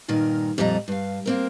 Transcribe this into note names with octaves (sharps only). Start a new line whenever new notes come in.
G2 A#2 D#3 A#4
F2 A#2 G3 D#5 A#5
G2 F5
A#3 C4 A#4